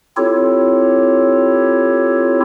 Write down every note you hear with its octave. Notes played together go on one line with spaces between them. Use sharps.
C4 E4 F4 G4 A4 C#5